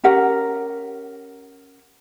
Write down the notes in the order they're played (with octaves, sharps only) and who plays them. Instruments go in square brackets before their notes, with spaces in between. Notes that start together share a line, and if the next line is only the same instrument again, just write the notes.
[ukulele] C#4 G4 A#4 F#5